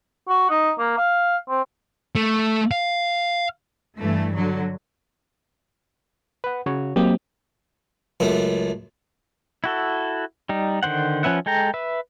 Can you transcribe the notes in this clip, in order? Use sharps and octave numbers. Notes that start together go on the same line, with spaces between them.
F#4
D#4
A#3
F5
C4
A3
F5
G2 E3 A3
D3 F#3
B4 F#5
C#3 F#4 C#5
F#3 A#3 C4 G4 D#5
C#2 F#2 A3
E4 F#4 A4
G3 D#4
D3 D#3 C5 F#5
F3 C#4 B4 E5 F#5
G#3 A4 G5 A#5
B4 E5